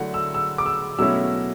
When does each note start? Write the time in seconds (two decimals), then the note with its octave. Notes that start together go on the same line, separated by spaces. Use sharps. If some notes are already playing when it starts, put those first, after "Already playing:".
Already playing: D3 F#3 A3 E4 F#5
0.14 E6
0.34 E6
0.58 D6
0.66 E6
0.99 B2 F#3 A3 C#4 E4 E6